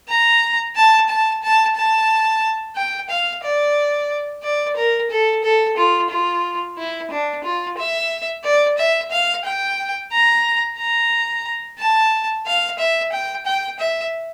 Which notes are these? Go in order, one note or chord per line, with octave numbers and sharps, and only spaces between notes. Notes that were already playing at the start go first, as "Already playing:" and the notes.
A#5
A5
A5
A5
A5
G5
F5
D5
D5
A#4
A4
A4
F4
F4
E4
D4
F4
E5
D5
E5
F5
G5
A#5
A#5
A5
F5
E5
G5
G5
E5